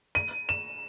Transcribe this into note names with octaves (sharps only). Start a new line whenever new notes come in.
D#7
E7